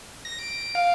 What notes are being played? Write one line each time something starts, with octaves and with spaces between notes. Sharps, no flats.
A#6
D7
F5